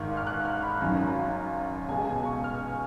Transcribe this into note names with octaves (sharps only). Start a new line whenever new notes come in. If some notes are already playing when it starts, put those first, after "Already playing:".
Already playing: G#1 G#2 D#3 F6
F6
F#6
F6
B5
G#1 F#2 D#3 F#3 A#5
C#2 B2 G#3 G#5
G#5
C#6
F6